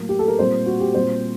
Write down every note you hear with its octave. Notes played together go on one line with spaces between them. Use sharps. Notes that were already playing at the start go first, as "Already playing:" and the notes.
Already playing: A2 F#3 A#3
G4
A4
A#4
A#2 G3 C4 C5
F#4
G4
A#2 G3 C4 C5